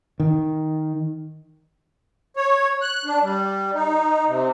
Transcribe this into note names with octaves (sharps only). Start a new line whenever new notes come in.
D#3
C#5
F#6
D4
G3
D#4
C3